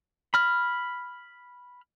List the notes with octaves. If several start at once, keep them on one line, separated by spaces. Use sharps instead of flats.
B5 F6